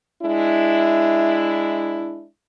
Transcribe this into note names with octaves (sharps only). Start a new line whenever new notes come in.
G#3 D4 E4